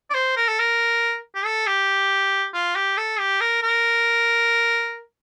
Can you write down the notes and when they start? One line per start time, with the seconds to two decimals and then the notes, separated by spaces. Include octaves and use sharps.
0.10 D5
0.14 C5
0.36 A#4
0.48 A4
0.59 A#4
1.35 G4
1.45 A4
1.67 G4
2.54 F4
2.76 G4
2.97 A4
3.19 G4
3.41 A#4
3.63 A#4